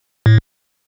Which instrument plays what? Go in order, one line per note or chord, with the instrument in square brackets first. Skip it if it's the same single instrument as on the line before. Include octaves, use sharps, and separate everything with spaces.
[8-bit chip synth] A2